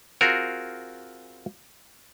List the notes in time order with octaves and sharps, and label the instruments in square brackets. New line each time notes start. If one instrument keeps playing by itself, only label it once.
[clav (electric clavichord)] C4 F4 F#4 G#4 A#4